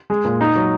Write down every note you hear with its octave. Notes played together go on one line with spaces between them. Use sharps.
G#3
A#2
D#4
F#3